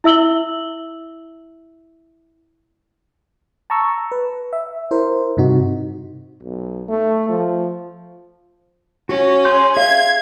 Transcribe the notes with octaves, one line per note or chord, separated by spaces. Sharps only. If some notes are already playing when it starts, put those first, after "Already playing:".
E4 E5 E6 F#7 G7
A5 A#5 C#6 E6
B4
E5
E4 A#4 C5
G2 C3 D#4 F#4
B1
A3
F3
C#4 F#4
G#4 C6 G6
G#4 E5 F5 G#6